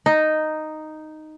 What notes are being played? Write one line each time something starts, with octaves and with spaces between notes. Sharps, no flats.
D#4